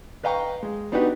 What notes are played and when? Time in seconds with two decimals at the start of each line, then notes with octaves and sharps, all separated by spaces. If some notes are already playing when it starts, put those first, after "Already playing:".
0.23 B4 D#5 F5 G5 A#5 C#6
0.63 G#3
0.92 B3 D4 D#4 F#4 G4 B4